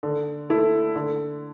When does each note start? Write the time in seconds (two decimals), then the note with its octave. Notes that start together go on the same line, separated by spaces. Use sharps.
0.03 D3
0.50 A3 E4 A4
0.95 D3